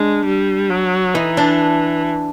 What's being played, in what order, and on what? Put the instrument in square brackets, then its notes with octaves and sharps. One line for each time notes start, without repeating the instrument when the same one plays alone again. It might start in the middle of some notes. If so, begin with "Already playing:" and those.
Already playing: [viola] G#3 [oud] D4
[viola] G3
F#3
[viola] E3 [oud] D#4
[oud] D4